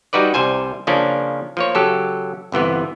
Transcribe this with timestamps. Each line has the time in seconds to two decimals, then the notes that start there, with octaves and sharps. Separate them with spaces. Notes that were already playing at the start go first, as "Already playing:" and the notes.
0.13 G3 D#4 F#4 B4 D5
0.34 C2 G3 C5 G#5
0.87 C#3 F3 A#3 C#4 D4
1.57 F3 A#3 C#5
1.75 C#3 F#3 G4 A4
2.52 G1 C3 E3 B3